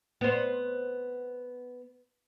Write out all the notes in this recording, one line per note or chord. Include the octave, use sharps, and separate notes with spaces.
B3 C5